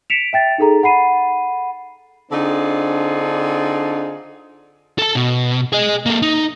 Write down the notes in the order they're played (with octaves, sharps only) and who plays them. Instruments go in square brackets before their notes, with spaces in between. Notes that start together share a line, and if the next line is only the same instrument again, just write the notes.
[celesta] B6 C#7 D7 E7 F7
E5 G5 A6
D#4 G#4 A4 A#5
F#5 B5 C7 D#7
[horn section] D3 C4 D4 D#4 F4 G#4
[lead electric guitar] A4 A5
B2
G#4 D#5
A#3 A4
D#4